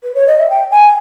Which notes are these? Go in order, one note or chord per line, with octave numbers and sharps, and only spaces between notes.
B4
C#5
D#5
E5
G5
G#5